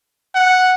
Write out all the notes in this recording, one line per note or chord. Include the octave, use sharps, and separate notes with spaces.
F#5